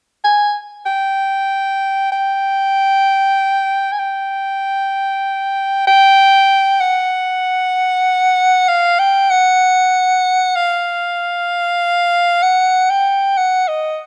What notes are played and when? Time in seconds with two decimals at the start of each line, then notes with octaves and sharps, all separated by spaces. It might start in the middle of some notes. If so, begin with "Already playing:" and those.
0.24 G#5
0.86 G5
2.12 G5
3.92 G#5
3.99 G5
5.87 G5
6.80 F#5
8.68 F5
8.99 G5
9.30 F#5
10.56 F5
12.43 F#5
12.90 G5
13.37 F#5
13.68 D#5